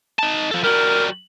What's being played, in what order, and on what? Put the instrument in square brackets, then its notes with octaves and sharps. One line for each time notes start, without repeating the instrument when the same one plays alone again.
[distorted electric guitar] D#4 A5
F3 A4
[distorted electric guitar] G3 F#4 [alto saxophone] A#4